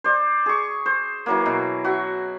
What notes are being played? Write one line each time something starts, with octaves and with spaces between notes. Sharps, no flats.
C5 D5
G#4 C#6
C5
E3 F#3 A#3
B2
F#4 E5